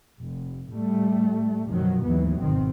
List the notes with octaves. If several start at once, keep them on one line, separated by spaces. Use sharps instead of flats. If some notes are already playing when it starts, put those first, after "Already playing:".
F1
A2 G3 A3
F#2 B2 D#3 F3 F#3
D#2 G#2 E3 F#3 B3
G#1 B2 D#3 C4